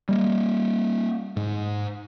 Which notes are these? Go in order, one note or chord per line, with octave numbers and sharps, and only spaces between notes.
G3 A#3
G#2